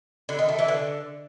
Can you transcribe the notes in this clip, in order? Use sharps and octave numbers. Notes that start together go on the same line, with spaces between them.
D3
D#3
A3
E3
D3